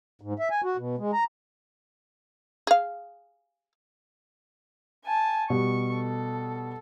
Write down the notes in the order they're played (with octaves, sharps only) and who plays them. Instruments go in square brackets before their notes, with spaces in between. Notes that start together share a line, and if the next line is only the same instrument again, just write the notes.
[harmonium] G#2
E5
G#5
F#4
B2
G#3
A#5
[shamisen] G#4 F5
[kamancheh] G#5 A5
[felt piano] B2 G3 [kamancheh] C#6
[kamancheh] A4